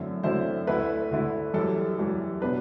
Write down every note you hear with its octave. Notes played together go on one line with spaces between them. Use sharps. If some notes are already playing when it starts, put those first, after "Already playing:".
Already playing: F#2 D3 A3 C4 E4
F#2 D3 A3 C4 E4 C5
D2 D3 A3 E4 B4
D2 D3 A3 E4
F#2 E3 G3 A4
F#2 E3 G3
B2 F#3 B3 D4 B4